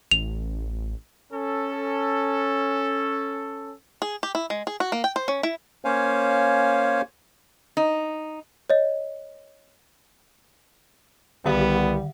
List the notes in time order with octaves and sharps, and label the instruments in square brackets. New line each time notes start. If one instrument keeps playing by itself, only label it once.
[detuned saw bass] A1 [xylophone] F7
[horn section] C#4 A4
[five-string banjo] G#4
G4
E4
G#3
G#4
F#4
A#3
G5
C5
C#4
E4
[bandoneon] A#3 C#4 C5 C#5 F5 G#5
[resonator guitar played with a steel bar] D#4
[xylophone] C#5 D#5
[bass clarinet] C2 [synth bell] D3 D#3 F#5 [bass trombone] G3 [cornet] B3